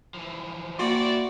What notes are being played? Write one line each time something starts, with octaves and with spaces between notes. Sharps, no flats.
E3 F3
A#3 E4 F#4 D5 G5 C6